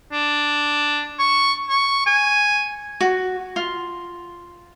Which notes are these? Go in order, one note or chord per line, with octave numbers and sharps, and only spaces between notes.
D4
C#6
C#6
G#5
F#4
F4